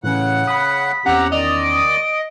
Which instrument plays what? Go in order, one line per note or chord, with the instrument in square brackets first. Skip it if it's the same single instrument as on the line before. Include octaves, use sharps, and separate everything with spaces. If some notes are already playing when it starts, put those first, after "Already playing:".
[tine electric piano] A2 E3 C#4 [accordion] C#3 F#5
[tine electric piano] B5 D#6 [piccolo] B6
[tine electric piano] E2 C#4 [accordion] C4 G4 A#5 [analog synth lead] F#5
[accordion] D#3 D5 [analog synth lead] D#5 [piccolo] F7
[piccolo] D7